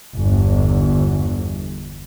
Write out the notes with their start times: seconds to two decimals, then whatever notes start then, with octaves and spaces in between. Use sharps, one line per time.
0.15 G1 E2